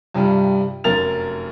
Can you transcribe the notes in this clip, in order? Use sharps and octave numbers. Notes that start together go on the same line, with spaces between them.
G2 C3 G3 F4
F1 F#2 A#4 A6 F7